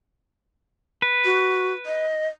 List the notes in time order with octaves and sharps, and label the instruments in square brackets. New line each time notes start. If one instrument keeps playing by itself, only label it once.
[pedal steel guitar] B4
[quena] F#4
D#5